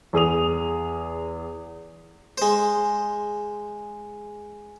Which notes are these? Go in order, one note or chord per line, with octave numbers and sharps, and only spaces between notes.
E2 G#4 D#6 F7
G#3 C5